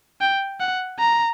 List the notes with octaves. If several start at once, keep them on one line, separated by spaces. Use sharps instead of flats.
G5
F#5
A#5